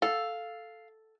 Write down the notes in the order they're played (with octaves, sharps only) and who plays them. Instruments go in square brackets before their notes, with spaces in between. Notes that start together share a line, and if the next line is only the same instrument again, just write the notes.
[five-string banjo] A4 [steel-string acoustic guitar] F5